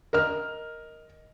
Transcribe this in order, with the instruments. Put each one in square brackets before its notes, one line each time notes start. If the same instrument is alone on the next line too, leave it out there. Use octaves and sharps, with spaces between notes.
[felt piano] A#4 D#5 F6